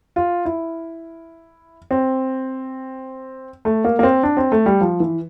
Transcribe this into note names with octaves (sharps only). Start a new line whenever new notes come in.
F4
E4
C4
A3
A#3
A#3
C4
D4
C4
A3
G3
F3
E3